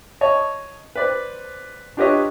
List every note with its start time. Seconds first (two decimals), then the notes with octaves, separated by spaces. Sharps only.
0.21 C#5 D#5 A5
0.96 B4 C5 D5
1.97 D4 F4 G4 B4 C#5 D#5